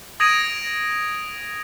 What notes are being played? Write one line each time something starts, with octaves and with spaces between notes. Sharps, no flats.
D#6 G#6 A#6 D7 D#7 F7